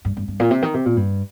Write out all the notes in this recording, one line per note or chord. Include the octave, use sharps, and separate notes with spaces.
G2
G2
G2
A#2
C3
D#3
C3
A#2
G2